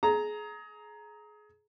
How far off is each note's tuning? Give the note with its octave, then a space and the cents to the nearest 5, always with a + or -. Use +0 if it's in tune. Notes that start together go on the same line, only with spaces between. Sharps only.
G#4 +25 A#5 +0